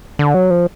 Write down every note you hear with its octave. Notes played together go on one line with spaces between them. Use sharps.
D3
F#3
F3